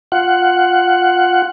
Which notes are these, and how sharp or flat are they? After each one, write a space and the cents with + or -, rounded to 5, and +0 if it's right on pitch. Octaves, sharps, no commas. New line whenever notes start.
F4 +10 F#5 +10